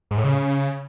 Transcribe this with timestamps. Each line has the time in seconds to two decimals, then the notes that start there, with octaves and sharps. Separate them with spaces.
0.11 G#2
0.17 A2
0.24 C#3